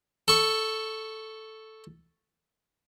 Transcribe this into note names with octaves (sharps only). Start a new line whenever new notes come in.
A4 C#6